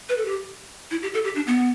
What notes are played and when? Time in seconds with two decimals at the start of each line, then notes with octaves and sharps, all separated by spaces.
0.09 B4
0.18 A4
0.25 G4
0.91 E4
1.02 G4
1.14 A4
1.25 G4
1.35 D4
1.47 B3